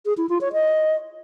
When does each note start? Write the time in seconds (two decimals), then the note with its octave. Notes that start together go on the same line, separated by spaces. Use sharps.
0.06 G#4
0.17 E4
0.29 F4
0.41 C#5
0.53 D#5